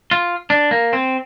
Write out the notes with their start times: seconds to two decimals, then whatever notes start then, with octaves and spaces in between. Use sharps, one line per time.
0.11 F4
0.50 D4
0.71 A#3
0.93 C4